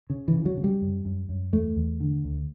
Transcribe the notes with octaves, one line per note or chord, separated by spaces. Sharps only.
C#3
E3
C#3
F#3
C#3
G3
F#2
F#2
F#2
E2 A3
E2
D3
D2